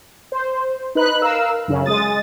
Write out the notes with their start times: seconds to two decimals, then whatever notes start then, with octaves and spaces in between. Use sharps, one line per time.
0.32 C5
0.95 D#4 B4 F#6
1.22 A#4 F5 E6
1.68 F#2 C#3
1.86 G#3 D#6 A6